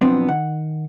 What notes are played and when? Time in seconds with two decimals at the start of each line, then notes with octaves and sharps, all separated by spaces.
0.01 B1 F3 B3 C4 D4
0.29 D#3 F#5